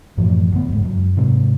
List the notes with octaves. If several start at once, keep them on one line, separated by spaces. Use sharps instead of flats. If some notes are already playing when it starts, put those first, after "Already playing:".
F#2 A2 E3 F3
D2 B3
F#1 G#2
F#2
G#2 C3 D#3